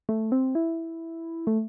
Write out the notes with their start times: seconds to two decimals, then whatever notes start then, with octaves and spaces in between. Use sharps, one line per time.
0.09 A3
0.32 C4
0.55 E4
1.47 A3